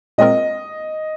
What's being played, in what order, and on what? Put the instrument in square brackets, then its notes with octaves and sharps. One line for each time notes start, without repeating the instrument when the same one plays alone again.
[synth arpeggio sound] A#2 G#3 C4 F4 A#4 [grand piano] D#5